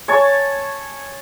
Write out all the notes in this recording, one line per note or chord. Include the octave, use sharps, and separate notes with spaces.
C#5 G#5 A5 C#6